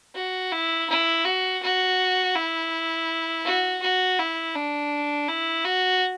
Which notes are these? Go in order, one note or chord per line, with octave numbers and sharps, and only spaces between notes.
F#4
E4
E4
F#4
F#4
E4
F#4
F#4
E4
D4
E4
F#4